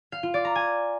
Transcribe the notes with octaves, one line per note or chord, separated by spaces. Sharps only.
F5
F4
D5
A#5
G#5